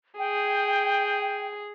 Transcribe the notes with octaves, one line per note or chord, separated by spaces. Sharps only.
G#4 G5